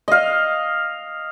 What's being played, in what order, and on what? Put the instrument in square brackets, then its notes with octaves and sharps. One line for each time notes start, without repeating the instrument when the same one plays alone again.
[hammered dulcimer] D#5 F5